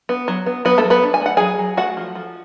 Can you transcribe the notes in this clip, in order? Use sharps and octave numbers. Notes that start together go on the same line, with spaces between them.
B3
F#3
B3
F#3 B3 B4
A3 A4
F#3
B3 B4
D4
G#5
A3 F#5
F#3 G#4 G#5
F#3
A3 F#4 F#5
F3
F3